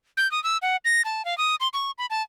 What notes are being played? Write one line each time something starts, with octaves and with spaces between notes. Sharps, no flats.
G6
D#6
E6
F#5
A#6
A5
F5
D#6
C6
C#6
B5
A5